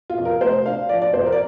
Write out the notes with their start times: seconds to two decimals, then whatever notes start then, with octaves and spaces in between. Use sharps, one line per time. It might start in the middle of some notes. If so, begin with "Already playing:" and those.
0.10 F4
0.18 F2
0.25 A#4
0.41 F1 C5
0.66 D4 F5
0.89 F3 D5
1.02 D5
1.14 F2 C5
1.26 A#4
1.32 D5